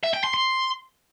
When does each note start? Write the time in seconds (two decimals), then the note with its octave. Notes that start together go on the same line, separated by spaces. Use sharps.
0.03 E5
0.14 G5
0.24 C6
0.34 C6